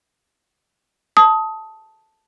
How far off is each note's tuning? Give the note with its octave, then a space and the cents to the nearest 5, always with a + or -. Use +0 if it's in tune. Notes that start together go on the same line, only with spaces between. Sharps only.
A5 +0 D#6 +20